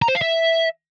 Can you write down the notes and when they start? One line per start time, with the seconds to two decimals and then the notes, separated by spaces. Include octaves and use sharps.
0.02 A#5
0.08 C5
0.15 F5
0.22 E5